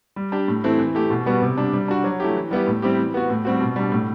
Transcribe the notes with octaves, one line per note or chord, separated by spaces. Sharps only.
G3
D4 G4
A2
E3 A3 C4 E4
E3
A3 E4 G4
B2
G3 B3 F#4
C3
G3 D4
G3
D4 F#4
F#3
A3 E4 G4
E3
G3 B3 E4 G4
A2
G3 C4 E4 G4
E3
B3 F#4
A2
G3 C4 F#4
B2
G3 D4
A2